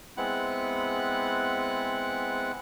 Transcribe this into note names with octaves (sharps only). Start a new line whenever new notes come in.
G#3 B3 C4 E4 F#5 F#6